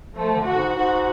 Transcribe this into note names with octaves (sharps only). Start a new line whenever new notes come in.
F3 A3
D3
F#4
G#2
G#2 F#4